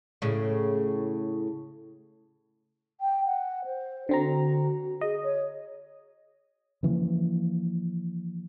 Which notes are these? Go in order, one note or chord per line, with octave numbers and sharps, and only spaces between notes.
A2 C#3
G5
F#5
C5
D3 C4 F#4 A#5
G#4 D#5
C#5
C#3 E3 F3 A#3